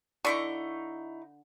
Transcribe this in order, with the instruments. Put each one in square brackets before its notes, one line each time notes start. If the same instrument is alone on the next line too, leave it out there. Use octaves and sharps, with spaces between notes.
[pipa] D3 [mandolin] D#4 E4 C#6